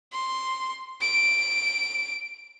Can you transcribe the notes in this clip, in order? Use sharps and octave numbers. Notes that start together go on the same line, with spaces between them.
C6
D7